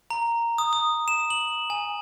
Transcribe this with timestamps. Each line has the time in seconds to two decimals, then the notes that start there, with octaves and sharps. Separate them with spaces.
0.10 A#5
0.58 D#6
0.73 D#6
1.08 E7
1.30 F#7
1.70 G#5